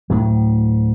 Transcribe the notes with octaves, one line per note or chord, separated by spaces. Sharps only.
D2 A2 F#3